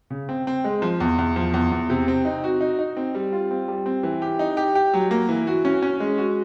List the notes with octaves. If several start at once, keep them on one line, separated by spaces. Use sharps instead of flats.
C#3
C4
C4
G#3
F3
E2
E2
F3
E2
E2
C3
C4
D#4
F#4
D#4
D#4
C4
G3
F4
C4
G3
C4
E3
G4
D#4
G4
G4
F#3
A#3
E3
F#4
C#4
C#4
G#3
F#4